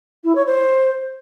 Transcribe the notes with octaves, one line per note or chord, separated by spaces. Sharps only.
E4
C#5
C5